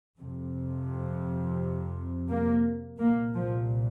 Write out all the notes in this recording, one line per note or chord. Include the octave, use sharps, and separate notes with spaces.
F2 C3
A#3
C2 A#2 A#3
F3